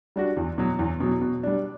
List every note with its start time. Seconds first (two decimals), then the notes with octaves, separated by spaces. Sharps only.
0.16 G3 D4 F#4
0.37 E2
0.58 B2 F#3
0.79 E2
1.00 B2 F#3
1.22 B2
1.43 G3 D4